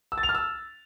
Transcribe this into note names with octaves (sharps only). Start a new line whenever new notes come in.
E6
A6
F7
F6
E6